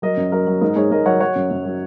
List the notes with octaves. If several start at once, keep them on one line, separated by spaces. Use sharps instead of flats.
F#3 A#4 D#5
F#2
F#3 A#4 D#5
F#3
G#2 A#4 D#5
G#2 G#4 C#5
G#2 A#4 D#5
F#3 C#5 F#5
F#3 C#5 F#5
F#2
F#2
F#3